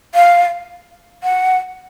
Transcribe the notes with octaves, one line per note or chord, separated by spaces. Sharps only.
F5
F#5